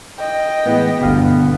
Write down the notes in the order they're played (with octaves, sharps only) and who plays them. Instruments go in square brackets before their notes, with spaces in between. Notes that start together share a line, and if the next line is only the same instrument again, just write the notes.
[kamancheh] D#5 G5
[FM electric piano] A2 E3 G#3 [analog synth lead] B3
[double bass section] G1 D2 D3 [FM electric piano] B2 G4 F5